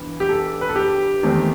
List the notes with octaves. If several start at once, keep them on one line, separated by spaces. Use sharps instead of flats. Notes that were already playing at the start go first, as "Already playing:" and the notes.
Already playing: G2 E3 B3
G4
A4
B4
A4
G4
E2 D#3 A3 C4